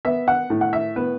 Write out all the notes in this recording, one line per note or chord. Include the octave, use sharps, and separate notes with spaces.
B3 E5
F#5
A2
F#5
E5
B3 B4